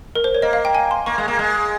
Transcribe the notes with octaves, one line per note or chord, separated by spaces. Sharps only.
A#4
C5
C#5
A#3 D#5
F5
G5
G#5
C6
A#3 C#6
G#3
A#3
G#3